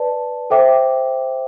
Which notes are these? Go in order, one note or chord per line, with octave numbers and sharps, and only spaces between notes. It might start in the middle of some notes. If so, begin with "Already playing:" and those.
Already playing: B4 D5 A5
A4 C5 E5 G5 D6